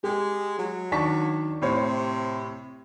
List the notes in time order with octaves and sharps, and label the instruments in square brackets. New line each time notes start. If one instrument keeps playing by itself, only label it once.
[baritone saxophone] G#3 [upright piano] G4
[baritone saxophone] F#3
[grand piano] D#3 D4 [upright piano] A5 C#6 B6
[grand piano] A2 C5 C#5 [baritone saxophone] C3